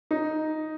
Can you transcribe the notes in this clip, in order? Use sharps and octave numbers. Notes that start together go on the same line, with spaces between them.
D#4